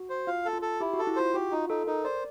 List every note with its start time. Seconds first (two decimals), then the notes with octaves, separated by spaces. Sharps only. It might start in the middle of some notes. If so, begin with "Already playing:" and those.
Already playing: F#4
0.10 C5
0.27 F4 F5
0.45 A4
0.53 F4
0.62 A4
0.80 E4 G4
0.94 F#4
0.99 A4
1.07 E4
1.16 F4 C5
1.34 F#4 G4
1.52 D#4 F4
1.69 D#4 A4
1.87 D#4 A#4
2.04 C5 D5